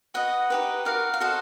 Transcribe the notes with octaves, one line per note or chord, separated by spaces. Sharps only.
F#4 B4 D#5 F#5
D#4 G4 B4
F#4 A#4 D5 F5
F5
F#4 A4 C5 D#5 F#5